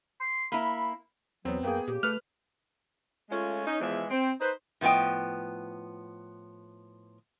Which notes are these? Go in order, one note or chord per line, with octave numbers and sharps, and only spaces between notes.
C6
A#3 E4 B5
E2 F#3 B3 C4
F#2 A#3 B3 G#4 G5
A#2 C#3 G4
A3 B4 F6 F#6
G#3 A3 C#4 F4
C#4 D#4
E2 E3 F3 G#3 E5
C4
D#4 B4 C5
A2 F3 B3 D#5 G5